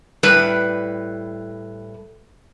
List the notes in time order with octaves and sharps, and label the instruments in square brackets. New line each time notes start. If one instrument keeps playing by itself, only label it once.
[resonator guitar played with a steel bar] A2 G3 B4